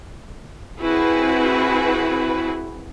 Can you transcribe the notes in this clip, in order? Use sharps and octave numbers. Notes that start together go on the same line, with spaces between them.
C4 E4 F#4 G#4 B4